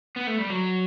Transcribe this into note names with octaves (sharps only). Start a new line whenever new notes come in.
B3
A3
G3
F#3